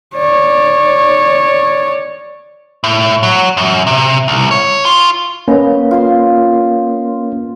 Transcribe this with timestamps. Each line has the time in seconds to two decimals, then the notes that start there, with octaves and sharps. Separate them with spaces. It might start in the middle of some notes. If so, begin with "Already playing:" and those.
0.17 C#5 D5
2.84 A2
3.23 F#3
3.57 F#2
3.87 C3
4.28 C2
4.51 C#5
4.85 F4
5.48 A#3 C#4 B4 D#5
5.91 F4 C5